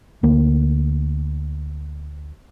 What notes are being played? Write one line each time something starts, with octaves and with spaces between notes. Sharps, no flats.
D2 A#3